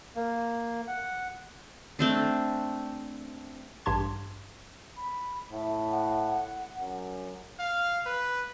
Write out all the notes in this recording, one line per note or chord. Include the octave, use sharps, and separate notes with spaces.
A#3
F#5
A3 C4 D4
A1 G2 G4 A5 C6 G#6
B5
A2 E5
F#5
F#2
F5
B4